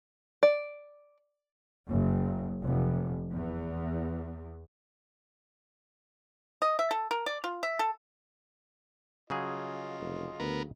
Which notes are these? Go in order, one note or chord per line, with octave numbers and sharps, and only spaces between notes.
D5
F#1
F1
E2
D#5
E5
A4
A#4
D5
F4
E5
A4
C#3 F#3 F4 G#4 D#5
F1
D2 B3 A#4